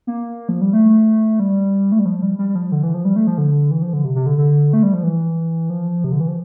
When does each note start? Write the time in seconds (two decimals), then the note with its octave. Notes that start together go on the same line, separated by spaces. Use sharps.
0.07 A#3
0.49 F3
0.61 G3
0.73 A3
1.40 G3
1.92 A3
1.99 G3
2.06 F3
2.22 G3
2.39 G3
2.49 G3
2.55 F3
2.72 D3
2.83 E3
2.94 F3
3.05 G3
3.16 A3
3.27 F3
3.38 D3
3.71 E3
3.82 F3
3.93 D3
4.05 C3
4.15 C3
4.26 D3
4.38 D3
4.73 A3
4.83 G3
4.94 F3
5.03 E3
5.70 F3
6.04 C3
6.12 D3
6.20 E3
6.28 F3